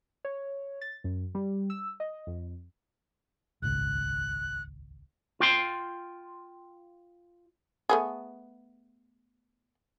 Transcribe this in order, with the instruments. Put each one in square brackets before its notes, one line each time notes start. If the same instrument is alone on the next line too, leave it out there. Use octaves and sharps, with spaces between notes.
[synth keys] C#5
A6
F#2
G3
E6
D#5
F2
[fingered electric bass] D#1 G#1 C#2 [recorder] F#6
[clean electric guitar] F4 G5 C6
[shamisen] A3 B3 G#4